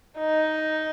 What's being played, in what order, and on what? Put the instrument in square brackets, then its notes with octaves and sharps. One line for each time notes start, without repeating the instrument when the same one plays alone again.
[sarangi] D#4